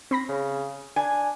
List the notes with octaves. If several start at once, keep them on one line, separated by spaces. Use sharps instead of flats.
C4 B5 A#6
C#3
D4 G#5